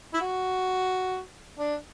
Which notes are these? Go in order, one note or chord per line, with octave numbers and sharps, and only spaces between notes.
E4
F#4
D4